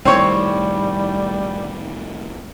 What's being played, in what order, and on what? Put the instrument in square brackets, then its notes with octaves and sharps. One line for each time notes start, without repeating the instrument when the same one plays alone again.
[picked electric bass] C2 A2 D#3 [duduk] G3 [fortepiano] C4 C#5